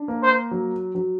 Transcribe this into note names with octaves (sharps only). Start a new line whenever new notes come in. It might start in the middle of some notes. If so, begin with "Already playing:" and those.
Already playing: D4
A#3
C5
F#3
F#3